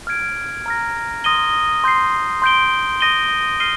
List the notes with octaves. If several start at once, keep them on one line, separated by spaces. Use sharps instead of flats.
F6 G#6 D7
A#5 F6 A#6
C6 D#6 A#6 D#7 G7
C6 G6 C7
C6 G6 D7 G7
C6 D#6 A#6 D#7 G7
F6 C7 D#7 G7